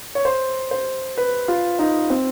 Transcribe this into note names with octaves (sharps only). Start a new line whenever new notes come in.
C#5
C5
C5
B4
F4
D#4
C4